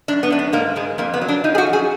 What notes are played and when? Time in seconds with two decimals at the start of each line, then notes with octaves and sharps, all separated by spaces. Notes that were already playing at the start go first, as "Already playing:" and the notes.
0.08 F#2 D4
0.23 B3
0.30 F#2 D4
0.39 B3
0.53 G#2 A#3
0.76 G#2 G#3
0.98 F2 A#3
1.14 B3
1.21 F#3
1.28 D4
1.44 F3 D#4
1.55 G#4
1.58 F#4
1.67 F#2
1.73 G#4